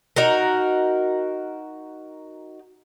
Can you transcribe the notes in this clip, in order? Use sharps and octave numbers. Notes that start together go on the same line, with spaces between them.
D#4 F#4 A#4